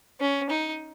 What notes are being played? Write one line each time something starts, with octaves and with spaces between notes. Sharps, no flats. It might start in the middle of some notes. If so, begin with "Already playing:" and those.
C#4
D#4